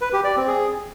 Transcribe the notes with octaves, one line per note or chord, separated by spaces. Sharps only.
B4
G4
D5
C4
G#4